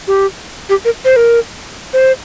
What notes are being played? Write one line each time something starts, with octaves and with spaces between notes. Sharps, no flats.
G4
G4
A#4
C5
A#4
C5